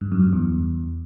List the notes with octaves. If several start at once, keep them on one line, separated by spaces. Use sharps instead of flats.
G2
F#2
G2
E2